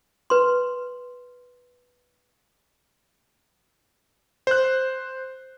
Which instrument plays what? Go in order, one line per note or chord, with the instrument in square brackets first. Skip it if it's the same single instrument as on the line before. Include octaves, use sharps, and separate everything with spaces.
[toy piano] B4 C6
[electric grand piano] C5 F#6